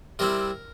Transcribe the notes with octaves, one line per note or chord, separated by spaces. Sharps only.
C3 G3 C4 E4 A#4